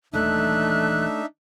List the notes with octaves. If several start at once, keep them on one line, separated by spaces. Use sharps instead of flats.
D#1 E3 A3 D4 D#4 E5 F#6